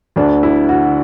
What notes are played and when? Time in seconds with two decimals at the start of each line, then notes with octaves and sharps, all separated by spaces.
0.16 D2 D3 D4
0.43 E4
0.69 F#4